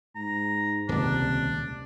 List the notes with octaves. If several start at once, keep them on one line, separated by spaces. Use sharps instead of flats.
G#2 A#5
D#1 C#2 C3 D4